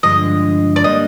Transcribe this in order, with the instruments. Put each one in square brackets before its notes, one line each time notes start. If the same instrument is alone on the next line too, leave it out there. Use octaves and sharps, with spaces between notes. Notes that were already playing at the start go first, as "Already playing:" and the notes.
[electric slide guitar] G2 D3 F3 G#3 D4 [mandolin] D#5
[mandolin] D5
[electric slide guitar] G3 A#3 D4 [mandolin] D#5